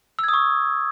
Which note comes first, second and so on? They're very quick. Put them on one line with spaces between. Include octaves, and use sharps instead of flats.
E6 G#6 D#6 C#6